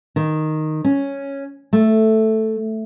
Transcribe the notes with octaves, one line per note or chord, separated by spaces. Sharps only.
D#3
C#4
A3